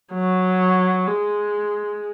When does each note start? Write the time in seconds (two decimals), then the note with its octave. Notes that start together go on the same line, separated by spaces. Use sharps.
0.13 F#3
1.08 G#3